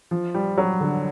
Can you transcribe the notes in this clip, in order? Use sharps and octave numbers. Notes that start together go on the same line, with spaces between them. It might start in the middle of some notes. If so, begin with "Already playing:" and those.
F3
G3
F#3
D3